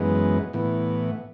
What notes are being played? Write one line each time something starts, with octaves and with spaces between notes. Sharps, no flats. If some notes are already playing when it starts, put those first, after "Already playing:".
Already playing: F#2 E3 G#3 B3
A2 E3 B3